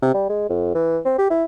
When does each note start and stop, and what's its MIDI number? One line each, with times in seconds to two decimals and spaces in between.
0.02 0.13 48
0.14 0.28 55
0.29 0.47 56
0.50 0.72 41
0.74 0.98 52
1.05 1.16 60
1.18 1.30 67
1.30 1.44 64